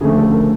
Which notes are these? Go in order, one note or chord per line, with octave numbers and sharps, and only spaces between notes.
D2 C#3 F3 A3 G#4
A4
A#4